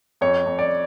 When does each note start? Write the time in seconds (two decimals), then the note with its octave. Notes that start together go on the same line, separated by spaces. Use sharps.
0.21 F2 C#5
0.46 F2
0.59 D5